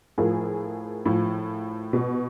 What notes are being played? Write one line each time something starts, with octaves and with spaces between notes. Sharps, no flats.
A2 F3 G#4 A#4
A2 F3
B2